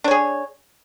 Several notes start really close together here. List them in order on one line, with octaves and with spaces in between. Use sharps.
D4 C#5 G#4